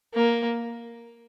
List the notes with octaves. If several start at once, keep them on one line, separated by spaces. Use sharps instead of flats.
A#3